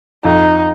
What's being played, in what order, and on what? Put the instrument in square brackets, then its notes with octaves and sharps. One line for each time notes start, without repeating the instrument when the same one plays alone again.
[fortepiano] F2 [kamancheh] D#4